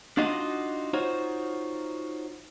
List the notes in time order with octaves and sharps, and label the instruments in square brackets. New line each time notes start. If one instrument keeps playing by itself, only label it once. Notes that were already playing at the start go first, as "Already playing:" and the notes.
[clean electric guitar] D4 D#4 F4 F#4 D#5
D#4 F4 F#4 C5 C#5